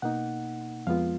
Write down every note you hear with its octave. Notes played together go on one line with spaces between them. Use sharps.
B2 A#3 D#4 F#5
F2 F3 G#3 B3 F4 F5